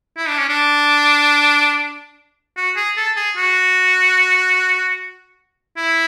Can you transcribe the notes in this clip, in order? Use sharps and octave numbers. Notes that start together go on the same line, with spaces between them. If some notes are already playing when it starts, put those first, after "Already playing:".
E4
D4
C#4
D4
F#4
G#4
A4
G#4
F#4
E4